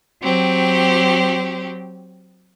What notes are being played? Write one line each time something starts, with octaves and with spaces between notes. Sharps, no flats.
F#3 C4 G4